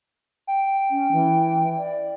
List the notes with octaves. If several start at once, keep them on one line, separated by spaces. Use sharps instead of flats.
G5
C#4
E3
D5